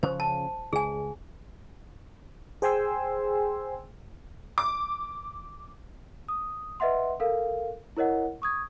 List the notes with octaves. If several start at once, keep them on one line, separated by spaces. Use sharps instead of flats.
C#3 F3 C#4 C5
A5
C#2 G#4 G#5
G#4 C5 G5 G#5 C6 E6
D6
D#6
B4 D#5 E5 F#5 C6
A4 A#4 F5
E4 A#4 C#5 D#5 F#5
C#6 D#6 G#6